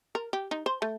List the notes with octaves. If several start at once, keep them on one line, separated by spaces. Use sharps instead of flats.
A#4
G4
D#4
C5
A3